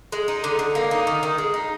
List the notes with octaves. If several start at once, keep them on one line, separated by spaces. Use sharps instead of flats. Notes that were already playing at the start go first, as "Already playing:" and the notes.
G#3
D#4
D3
D3
A#3
D#4
D#3
D#3
G#3
D#4